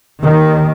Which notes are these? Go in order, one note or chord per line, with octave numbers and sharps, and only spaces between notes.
D#2 D#3